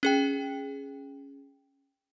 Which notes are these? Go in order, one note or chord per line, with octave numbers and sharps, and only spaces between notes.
C#4 G#4 G5